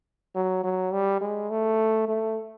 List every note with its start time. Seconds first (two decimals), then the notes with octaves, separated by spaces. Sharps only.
0.35 F#3
0.64 F#3
0.92 G3
1.21 G#3
1.50 A3
2.08 A3